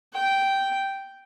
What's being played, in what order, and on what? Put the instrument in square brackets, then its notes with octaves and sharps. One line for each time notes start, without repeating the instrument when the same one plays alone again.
[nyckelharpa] G5